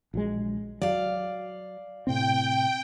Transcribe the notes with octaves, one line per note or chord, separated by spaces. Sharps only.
A#1 F#3 G#3
F#3 D5 F5
A2 C3 C4 G5